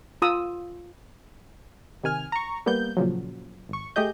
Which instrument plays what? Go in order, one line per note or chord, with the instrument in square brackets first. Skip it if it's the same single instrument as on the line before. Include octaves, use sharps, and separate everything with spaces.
[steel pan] F4 D#6 E6
[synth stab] C3 D#3 G#5 F6
A#5 C#6
G3 A#3 B3 G6
A#2 C#3 F3 F#3
G#1 C#6
A3 G4 G#4 D#5 G6